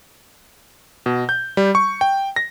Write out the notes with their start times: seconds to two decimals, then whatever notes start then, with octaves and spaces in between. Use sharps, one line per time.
1.06 B2
1.29 G6
1.57 G3
1.75 C#6
2.01 G5
2.36 A#6